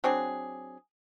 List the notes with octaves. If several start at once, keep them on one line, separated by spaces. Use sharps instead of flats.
F#3 C4 D4 G#4